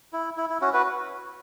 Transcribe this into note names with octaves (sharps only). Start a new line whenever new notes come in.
E4
E4
E4
C#4 F#4
F#4 B4